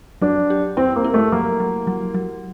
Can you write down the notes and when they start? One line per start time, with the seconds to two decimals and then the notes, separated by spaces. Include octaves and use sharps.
0.22 F#3 D4
0.50 G4
0.77 C4 E4
0.96 A#3
1.04 E4
1.14 A3
1.32 F#3 A#3
1.60 F#3
1.87 F#3
2.14 F#3